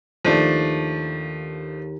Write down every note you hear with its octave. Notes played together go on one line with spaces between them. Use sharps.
D#2 F3 A3 D4